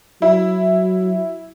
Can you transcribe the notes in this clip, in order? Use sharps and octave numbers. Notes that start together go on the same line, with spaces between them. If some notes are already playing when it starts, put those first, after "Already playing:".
F#3 E4